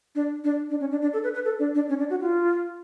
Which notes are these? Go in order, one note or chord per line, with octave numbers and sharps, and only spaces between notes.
D4
D4
D4
C#4
D4
D4
A4
B4
B4
A4
D4
D4
C#4
D4
F#4
F4